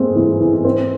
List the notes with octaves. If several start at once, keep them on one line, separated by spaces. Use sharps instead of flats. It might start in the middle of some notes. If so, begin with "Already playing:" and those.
Already playing: G#3 A#3 C4
E3
E3
C4